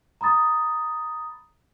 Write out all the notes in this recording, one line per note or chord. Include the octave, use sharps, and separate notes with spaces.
A#5 B5 D#6 A6